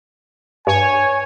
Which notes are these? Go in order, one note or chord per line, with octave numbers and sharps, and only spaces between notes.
G2 C#5 G#5